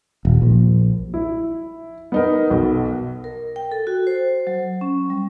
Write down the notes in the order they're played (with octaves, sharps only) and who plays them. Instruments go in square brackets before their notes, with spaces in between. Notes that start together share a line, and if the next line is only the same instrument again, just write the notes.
[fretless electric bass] D#1
A#1
[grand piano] E4
B3 D#4 A#4
B1
[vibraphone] A#4
G5
A4
F#4
C5
F#3
C#4
G3